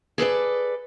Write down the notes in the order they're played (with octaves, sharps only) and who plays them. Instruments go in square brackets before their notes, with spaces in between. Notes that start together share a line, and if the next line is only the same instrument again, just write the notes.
[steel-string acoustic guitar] G#4 A4 B4 D5